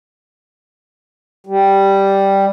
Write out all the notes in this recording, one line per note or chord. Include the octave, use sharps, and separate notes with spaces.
G3